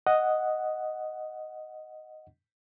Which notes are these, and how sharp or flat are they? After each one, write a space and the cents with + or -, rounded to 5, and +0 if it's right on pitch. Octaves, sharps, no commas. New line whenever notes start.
D#5 +0 F#5 +0